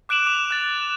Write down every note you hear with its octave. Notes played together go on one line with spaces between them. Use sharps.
D6 F#6 D7 E7 F#7
D6 F7
F#6 A6